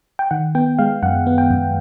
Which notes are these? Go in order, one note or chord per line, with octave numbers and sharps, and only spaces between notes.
G5
D#3 F#5
B3 G5
G#3 F5
F#2 F#5
B3
G5
F#2